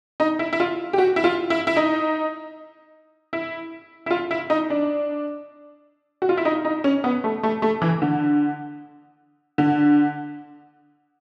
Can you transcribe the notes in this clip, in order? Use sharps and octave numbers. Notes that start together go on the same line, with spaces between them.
D#4
E4
E4
F4
G4
F#4
E4
F4
E4
E4
D#4
E4
E4
F4
E4
D#4
D4
F#4
F4
E4
D#4
D#4
C#4
B3
A3
A3
A3
E3
D3
D3